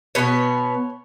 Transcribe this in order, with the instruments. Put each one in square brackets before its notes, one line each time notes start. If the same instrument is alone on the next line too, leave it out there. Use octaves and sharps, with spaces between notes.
[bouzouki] B2 B3 C#5